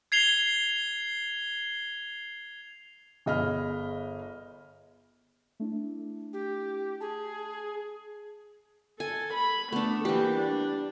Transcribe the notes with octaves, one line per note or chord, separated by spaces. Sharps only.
G#6 C7 F7 G7
G1 G#4 D#5 B5 F6
A3 D4 E4
G4
G#4 A5
A4 G#5
B5
A3 B3 D4
E3 G3 A#3 G4
D4